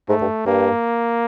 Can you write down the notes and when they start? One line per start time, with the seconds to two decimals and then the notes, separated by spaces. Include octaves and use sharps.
0.09 G#2 A3
0.21 G2
0.46 G2 A#3